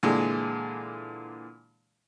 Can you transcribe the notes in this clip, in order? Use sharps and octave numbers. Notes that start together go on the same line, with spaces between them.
A#2 D3 E3 G#3